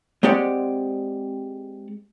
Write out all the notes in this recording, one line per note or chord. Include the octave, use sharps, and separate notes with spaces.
G#3 C4 G4 D5 F#5